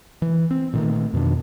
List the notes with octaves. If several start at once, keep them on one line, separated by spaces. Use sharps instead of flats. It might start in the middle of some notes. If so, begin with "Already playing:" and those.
E3
C4
A#2 D#3 A3
F2 B2 D#3 D4